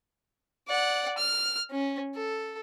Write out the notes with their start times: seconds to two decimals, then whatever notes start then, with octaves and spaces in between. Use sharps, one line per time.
0.68 D5 F#5
1.18 F6
1.71 C#4
2.15 A4